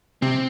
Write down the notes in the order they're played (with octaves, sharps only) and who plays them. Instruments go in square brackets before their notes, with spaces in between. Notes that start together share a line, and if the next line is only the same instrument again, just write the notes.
[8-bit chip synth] C3 [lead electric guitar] C4